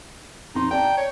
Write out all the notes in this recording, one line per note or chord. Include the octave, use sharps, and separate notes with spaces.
F2 D#4 C6
D5 G5 A5 A#5
C#5